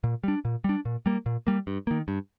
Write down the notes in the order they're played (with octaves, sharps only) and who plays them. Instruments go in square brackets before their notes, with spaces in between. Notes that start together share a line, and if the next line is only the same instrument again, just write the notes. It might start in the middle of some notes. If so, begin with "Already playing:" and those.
[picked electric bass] A#2
G3 D4
A#2
G3 D4
A#2
G3 A#3
A#2
G3 A#3
G2
D#3 A#3
G2